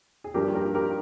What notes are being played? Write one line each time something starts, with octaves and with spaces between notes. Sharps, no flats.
G#4
G2 F3 A#3 G4 A#4
G4 A#4
G4 A#4